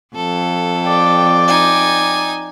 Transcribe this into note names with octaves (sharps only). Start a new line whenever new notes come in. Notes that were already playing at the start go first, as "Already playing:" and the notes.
F2 A4
D5 G5
D#4 G#5